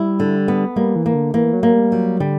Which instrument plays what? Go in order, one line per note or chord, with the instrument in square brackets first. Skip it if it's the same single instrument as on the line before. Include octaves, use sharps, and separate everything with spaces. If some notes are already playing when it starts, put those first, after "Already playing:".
Already playing: [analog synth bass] G3 [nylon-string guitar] E4
[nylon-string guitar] D3
B3
[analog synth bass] G3 [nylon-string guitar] A#3
[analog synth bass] E3
[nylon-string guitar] A#3
[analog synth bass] D3
[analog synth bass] E3 [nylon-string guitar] A#3
[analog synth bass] F#3
[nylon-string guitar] A#3
[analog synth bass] G3
[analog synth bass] F#3 [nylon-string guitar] G3
[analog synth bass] D3 [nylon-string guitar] G3